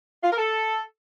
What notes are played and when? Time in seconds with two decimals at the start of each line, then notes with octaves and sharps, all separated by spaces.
0.22 F4
0.29 A#4
0.37 A4